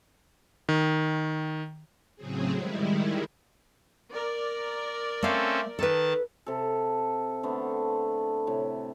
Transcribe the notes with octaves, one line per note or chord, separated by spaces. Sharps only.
D#3
A2 C#3 F#3 C4 G#4
D#3 G3 G#3 E4
A#4 D5
A3 C4 C#4 A4 F5
D#3 A4 B4 A5
C3 A4
D3 A3 B3 C4
A2 C3